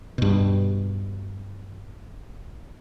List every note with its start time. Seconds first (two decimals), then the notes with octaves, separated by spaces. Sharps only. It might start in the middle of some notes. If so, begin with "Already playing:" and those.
0.18 G2 B2